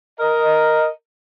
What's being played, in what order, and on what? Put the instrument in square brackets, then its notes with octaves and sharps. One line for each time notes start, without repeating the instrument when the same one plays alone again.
[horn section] A#4 D#5